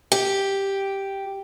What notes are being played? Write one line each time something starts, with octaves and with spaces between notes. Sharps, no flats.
G4